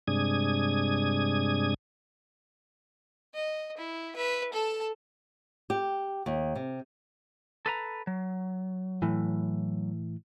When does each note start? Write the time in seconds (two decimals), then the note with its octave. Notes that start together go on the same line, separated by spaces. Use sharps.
0.08 G2 C3 G#3 D4 D#6 G#6
3.34 D#5
3.78 E4
4.16 B4 E5
4.53 A4 A5
5.70 G4
6.26 D#2
6.55 C3
7.66 A4 B4 A#5
8.07 F#3
9.02 A2 E3